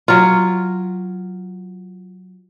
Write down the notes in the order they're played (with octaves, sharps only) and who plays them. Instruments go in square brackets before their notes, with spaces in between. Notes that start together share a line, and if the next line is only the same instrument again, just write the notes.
[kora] F#3 F4